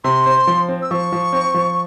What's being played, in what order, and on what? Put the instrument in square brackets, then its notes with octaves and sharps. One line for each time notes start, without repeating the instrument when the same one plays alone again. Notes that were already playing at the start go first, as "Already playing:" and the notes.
[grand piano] C3 [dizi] C6
[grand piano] C4
F3
C4
[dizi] E6
[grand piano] F3 [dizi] C#6
[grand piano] F3
C4
F3